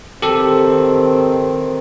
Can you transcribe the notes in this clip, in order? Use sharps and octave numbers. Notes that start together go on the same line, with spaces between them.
D#3 C4 G4 A4